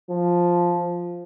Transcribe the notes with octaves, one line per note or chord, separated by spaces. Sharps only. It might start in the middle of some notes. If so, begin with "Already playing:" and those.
F3